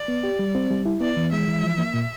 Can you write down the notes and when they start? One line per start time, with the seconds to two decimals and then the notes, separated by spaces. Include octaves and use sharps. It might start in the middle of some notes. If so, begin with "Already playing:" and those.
Already playing: D5
0.08 B3
0.24 G4
0.39 G3
0.55 C4
0.70 G3
0.86 E4
1.01 B3 D5
1.17 E3
1.32 G#3 E5
1.48 E3
1.63 F3
1.78 A#3
1.94 A#2